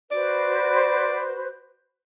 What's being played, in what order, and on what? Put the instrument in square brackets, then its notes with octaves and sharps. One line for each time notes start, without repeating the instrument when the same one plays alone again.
[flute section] F#4 B4 C5 [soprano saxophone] D5